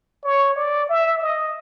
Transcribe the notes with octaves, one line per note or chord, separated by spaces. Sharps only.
C#5
D5
E5
D#5